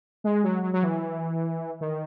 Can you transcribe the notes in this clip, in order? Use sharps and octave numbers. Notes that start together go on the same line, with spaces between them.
G#3
F#3
F#3
F#3
E3
D#3